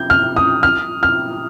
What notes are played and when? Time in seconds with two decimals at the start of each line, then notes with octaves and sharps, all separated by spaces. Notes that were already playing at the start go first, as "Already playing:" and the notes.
Already playing: G6
0.10 F6
0.36 D#6
0.63 F6
1.03 F6